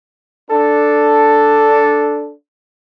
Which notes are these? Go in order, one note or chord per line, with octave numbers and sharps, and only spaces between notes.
D4 A4